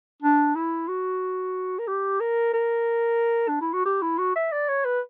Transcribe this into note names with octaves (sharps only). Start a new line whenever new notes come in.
D4
E4
F#4
A#4
G4
A#4
A#4
D4
E4
F#4
G4
E4
F#4
E5
D5
C#5
B4